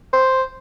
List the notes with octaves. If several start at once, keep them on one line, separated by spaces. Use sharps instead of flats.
C5